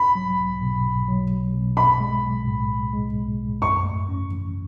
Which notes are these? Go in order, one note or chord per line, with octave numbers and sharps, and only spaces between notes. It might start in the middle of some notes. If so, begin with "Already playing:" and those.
Already playing: B1 B5
F#3
B1
B2
B1
F#3
B1
B2
B1 B5
G#3
B1
A2
B1
G#3
B1
A2
F#2 C#6
A3
C#4
E3